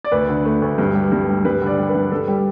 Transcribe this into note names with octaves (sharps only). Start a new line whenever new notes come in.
D5
D2 B4
D3
A3
D2
G2
G3
G2
G3
G2 B4
D3
D5
G3
B4
G2
G2 A4
G3